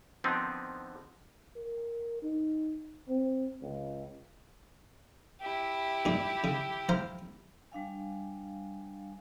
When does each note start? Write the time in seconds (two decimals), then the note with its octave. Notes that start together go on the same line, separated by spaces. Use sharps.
0.24 D3 D#3 F3 B3 C4 D#4
1.56 A#4
2.22 D#4
3.08 C4
3.62 C#2
5.41 E4 G4
6.05 G2 A#2
6.44 C#3
6.89 C5 F5 A#5
7.72 G3 D4 F5 G#5